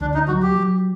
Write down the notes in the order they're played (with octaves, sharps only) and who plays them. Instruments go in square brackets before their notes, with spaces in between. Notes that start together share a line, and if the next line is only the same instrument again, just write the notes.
[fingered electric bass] D2 [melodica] D4
[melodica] D#4
[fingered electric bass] F#3 [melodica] F#4
[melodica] G4
[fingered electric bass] F#3